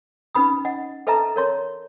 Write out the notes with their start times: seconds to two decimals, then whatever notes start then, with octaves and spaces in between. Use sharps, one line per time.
0.35 C#4 D#4 B4 B5 D#6
0.65 D#5 F#5
1.07 A4 B4 D#5 E5 A5 A#5
1.36 A#4 C#5 C6